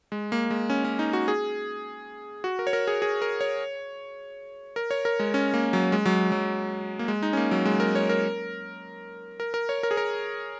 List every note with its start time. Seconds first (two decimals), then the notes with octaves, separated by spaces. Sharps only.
0.12 G#3
0.32 A#3
0.51 G#3
0.70 C#4
0.84 C#4
0.99 D#4
1.13 F#4
1.28 G#4
2.44 F#4
2.59 A#4
2.67 C#5
2.73 A#4
2.87 G#4
3.02 G#4
3.22 A#4
3.41 C#5
4.76 A#4
4.91 C#5
5.05 A#4
5.19 G#3
5.34 C#4
5.54 A#3
5.73 F#3
5.92 G#3
6.06 F#3
6.32 F#3
6.99 A#3
7.08 G#3
7.23 D#4
7.33 C#4
7.37 A#3
7.51 F#3
7.66 G#3
7.80 A#4
7.95 C#5
8.09 A#4
9.40 A#4
9.54 A#4
9.69 C#5
9.83 A#4
9.91 G#4
9.97 A#4